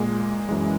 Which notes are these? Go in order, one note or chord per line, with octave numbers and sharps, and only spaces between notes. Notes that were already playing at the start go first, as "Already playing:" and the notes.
Already playing: A#2 G#3 A#3
F#2 E3 G#3